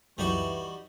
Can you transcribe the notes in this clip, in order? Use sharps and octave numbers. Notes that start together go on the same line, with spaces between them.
C#2 F#2 E3 G3 D#4 F#4 C#6